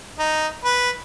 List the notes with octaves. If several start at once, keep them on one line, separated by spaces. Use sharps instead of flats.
D#4
B4